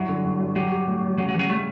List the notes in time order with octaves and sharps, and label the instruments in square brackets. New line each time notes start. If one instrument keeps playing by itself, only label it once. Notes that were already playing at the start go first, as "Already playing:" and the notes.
Already playing: [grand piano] G2 E4 [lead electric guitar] F#3
[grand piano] D3
G2
G2
[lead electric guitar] F#3 [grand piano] G4
[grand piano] G4
A2
A2
[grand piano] C#3 [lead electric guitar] F#3
[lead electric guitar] F#3
[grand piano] C#3 [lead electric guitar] E3
[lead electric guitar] F#3
[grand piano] G3 [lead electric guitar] A3